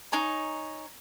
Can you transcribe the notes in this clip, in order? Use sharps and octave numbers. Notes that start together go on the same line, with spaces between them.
D#4 C#5 G#5 A#5